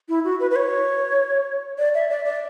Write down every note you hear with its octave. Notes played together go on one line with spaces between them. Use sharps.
E4
F#4
B4
B4
C#5
D5
E5
D5
D5